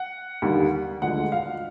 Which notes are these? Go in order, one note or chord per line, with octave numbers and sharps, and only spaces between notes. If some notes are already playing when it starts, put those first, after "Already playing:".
Already playing: F#5
D#2 D3 G3
D2 D3 F3 G#3 F#5
F5